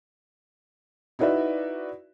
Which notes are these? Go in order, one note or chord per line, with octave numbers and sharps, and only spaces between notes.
D#4 E4 F#4 B4 D5 E5